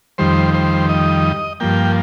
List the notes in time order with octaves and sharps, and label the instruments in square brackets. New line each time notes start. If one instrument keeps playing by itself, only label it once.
[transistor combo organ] F2 D#3 G3 C5
C5
D#5
G2 F3 A#3 G5